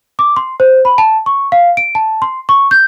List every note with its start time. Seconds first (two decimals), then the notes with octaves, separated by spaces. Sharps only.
0.19 D6
0.36 C6
0.60 C5
0.85 B5
0.98 A5
1.26 C#6
1.52 F5
1.77 D7
1.95 A5
2.22 C6
2.49 C#6
2.71 G6